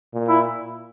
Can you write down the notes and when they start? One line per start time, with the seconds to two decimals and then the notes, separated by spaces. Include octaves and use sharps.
0.14 A#2
0.28 E4